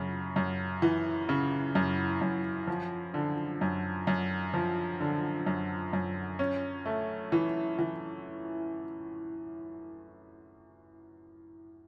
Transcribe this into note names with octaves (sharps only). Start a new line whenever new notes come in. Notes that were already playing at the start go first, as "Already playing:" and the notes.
Already playing: F#2 C#3
F#2
E3
C#3
F#2
F#2
F3
D3
F#2
F#2
F3
D3
F#2
F#2
C#4
A3
E3
E3